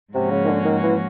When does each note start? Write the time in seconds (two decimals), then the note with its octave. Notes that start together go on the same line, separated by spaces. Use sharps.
0.14 G#2 C3 F3 A#3 C#4 F#4
0.31 C#3
0.45 D#3
0.48 D3
0.65 D#3
0.83 E3